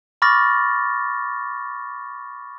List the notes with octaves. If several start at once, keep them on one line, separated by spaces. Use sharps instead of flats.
B5 C#6 D6 F6 A6 A#6